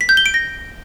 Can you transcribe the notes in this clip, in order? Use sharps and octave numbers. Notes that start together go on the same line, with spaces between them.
B6
G6
G7
D7
A#6